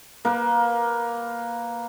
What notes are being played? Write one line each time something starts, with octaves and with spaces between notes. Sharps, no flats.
A#3 B4